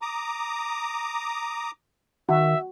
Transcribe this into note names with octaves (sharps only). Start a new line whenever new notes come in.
A#5 D6 D#6
D#3 F#4 E5